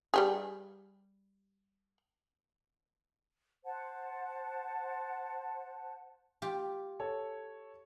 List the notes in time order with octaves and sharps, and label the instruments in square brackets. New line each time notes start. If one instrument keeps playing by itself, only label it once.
[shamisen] G3 G4 G#4
[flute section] C5 F#5 A5
[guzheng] F4 G4
[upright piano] A4 C#5